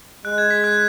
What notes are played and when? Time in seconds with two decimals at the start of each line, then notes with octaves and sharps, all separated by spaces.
0.25 G#3 F#6
0.38 G#6
0.51 B6
0.64 F#6